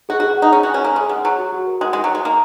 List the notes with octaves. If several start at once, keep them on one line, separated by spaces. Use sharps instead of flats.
F#4 G#4
F#4
G#4
D#4 F#5
C#4 C#5
F#4
G#5
C#4
A#3 G#5
G#3 G#4
G#3 F#5
F#3 F#5
F#4
F#4
A#4
G#3 F#5
G#3 D#4
F#3
G#3 D#4
A#3 D#4